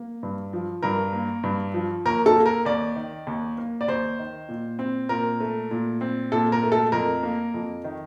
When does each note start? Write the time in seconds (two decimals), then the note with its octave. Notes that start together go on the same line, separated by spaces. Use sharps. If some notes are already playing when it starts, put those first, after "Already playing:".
Already playing: A#3
0.23 G2
0.53 F3
0.83 G2 A#4
1.13 A#3
1.43 G2
1.74 F3
2.05 D#2 A#4
2.26 A4
2.36 A#3
2.46 A#4
2.65 D#2 D5
2.96 D#3
3.27 D#2
3.58 A#3
3.81 D5
3.88 D#2 C5
4.19 D#3
4.49 A#2
4.79 C4
5.09 A#2 A#4
5.40 A3
5.71 A#2
6.01 C4
6.32 A#2 A4
6.52 A#4
6.63 A3
6.72 A4
6.92 F2 A#4
7.23 A#3
7.54 F2
7.84 D#3